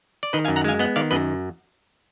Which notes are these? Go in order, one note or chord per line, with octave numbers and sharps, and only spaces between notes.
D5
D#3 B4 D#5
F5 G#5
F#2
F#5 A#5
G#3 F5 G#5
B3 D#5 F#5
D#3 D5 F5
F#2 B4 D#5